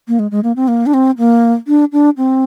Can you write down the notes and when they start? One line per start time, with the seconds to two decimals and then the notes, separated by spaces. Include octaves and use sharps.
0.08 A#3
0.19 G#3
0.31 G#3
0.44 A#3
0.56 C4
0.68 A#3
0.86 D4
0.94 C4
1.18 A#3
1.67 D4
1.92 D4
2.18 C4